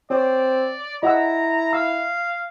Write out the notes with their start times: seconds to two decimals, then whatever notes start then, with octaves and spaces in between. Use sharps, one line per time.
0.10 C4 C#5 D5
1.03 E4 D#5 F#5 A#5 E6
1.73 F5 E6